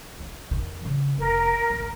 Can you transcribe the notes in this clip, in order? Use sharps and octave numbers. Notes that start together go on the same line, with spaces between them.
D#3
F2 D#3
C#3
F1 A#4
G#1 D2